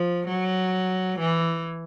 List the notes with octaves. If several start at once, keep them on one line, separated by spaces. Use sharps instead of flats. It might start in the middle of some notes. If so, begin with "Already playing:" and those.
Already playing: F3
F#3
E3